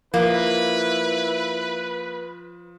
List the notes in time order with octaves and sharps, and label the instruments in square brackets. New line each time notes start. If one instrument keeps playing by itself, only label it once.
[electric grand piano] F3 [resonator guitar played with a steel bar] A#3 [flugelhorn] E4 [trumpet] B4